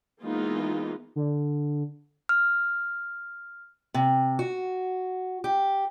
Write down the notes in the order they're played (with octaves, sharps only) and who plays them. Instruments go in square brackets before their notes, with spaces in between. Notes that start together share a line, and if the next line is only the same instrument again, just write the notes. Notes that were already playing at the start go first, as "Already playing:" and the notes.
[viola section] E3 G#3 A#3 B3 D#4 F4
[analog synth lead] D3
[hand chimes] F6
[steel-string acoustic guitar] C3
F#4
G4